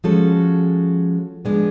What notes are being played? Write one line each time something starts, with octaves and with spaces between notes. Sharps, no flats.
F3 G#3 C#4 F#4 A4
F3 G#3 B3 D4